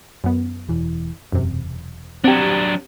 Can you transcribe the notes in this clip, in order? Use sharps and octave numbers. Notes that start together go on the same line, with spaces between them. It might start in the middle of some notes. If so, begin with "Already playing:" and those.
F#2 B3
E1 E3
E1 F#2 C3
F#3 C4 D4 G4 F#5